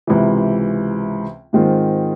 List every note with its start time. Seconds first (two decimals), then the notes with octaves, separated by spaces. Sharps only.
0.07 C#2 C3 E3
1.53 G#2 D#3 G#3 C4 F4